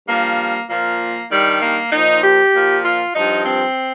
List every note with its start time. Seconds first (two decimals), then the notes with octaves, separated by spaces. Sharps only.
0.08 G2 F3 A#3
0.70 A#2 F3 A#3
1.31 G2 D#3 G3
1.62 A#3
1.92 A#2 F3 D#4
2.24 G4
2.54 A#2 F3
2.84 F4
3.15 G2 F3 D#4
3.45 C4